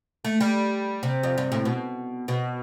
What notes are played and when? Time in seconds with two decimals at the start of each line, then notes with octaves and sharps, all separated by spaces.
0.25 A3
0.40 G3
1.03 C3
1.23 F2
1.38 G2
1.52 A2
1.65 B2
2.28 B2